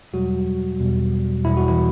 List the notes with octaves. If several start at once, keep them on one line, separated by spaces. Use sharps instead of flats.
E2 B2 F#3 G3 F#4
E2 B2 G3
E2 B2 G3 E4
F#4
E3 E4